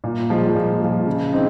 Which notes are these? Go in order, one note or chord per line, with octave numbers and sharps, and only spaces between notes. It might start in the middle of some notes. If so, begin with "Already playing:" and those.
A#2
F3 G#3
A#2
F3 G#3
C#3
G#3 C4 D#4